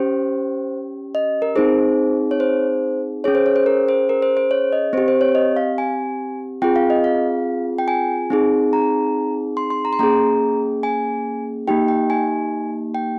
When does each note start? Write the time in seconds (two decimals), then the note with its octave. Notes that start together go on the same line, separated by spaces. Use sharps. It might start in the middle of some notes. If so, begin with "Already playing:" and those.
Already playing: C#4 G4 C5
1.15 D#5
1.42 A#4
1.56 C4 D#4 G#4 C5
2.31 C#5
2.40 C5
3.24 C#4 G#4 C#5
3.35 C5
3.46 C#5
3.56 C5
3.66 A#4
3.89 C5
4.09 A#4
4.22 C5
4.37 C5
4.51 C#5
4.73 D#5
4.93 C4 G4 C5
5.08 C5
5.21 C#5
5.35 D#5
5.56 F5
5.78 G#5
6.62 C4 F4 G#4 G5
6.76 F5
6.90 D#5
7.04 F5
7.78 G5
7.88 G#5
8.30 C4 D#4 G#4
8.73 A#5
9.57 C6
9.70 C6
9.85 A#5
9.93 C6
9.99 A#3 C#4 G#4 A#5
10.83 G#5
11.68 A#3 D#4 G4 G5
11.88 G5
12.10 G#5
12.95 G5